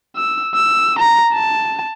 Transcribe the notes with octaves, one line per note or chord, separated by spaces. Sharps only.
E6
E6
A#5
A5